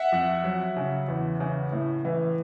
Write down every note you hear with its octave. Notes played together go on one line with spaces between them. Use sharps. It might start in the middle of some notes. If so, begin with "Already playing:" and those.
Already playing: E5 F#5
F2
F#3
C#3
E2
C#3
A2
E3